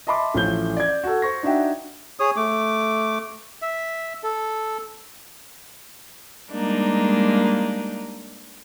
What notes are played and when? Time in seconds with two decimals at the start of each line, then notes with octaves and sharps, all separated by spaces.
0.07 D#5 E5 A5 B5 C6 D6
0.34 A1 A2 F3 F4 G6 G7
0.77 D5 G#6
1.04 F#4 A4
1.22 C5 C#6 A#6
1.43 D4 D#4 F#4 E5 G5
2.19 G#4 C#5 D#6
2.36 A3 D6
3.62 E5
4.23 A4
6.50 G3 G#3 A#3 D4 D#4